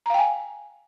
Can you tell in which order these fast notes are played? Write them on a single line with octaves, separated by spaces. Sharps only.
A#5 F5 G5 G#5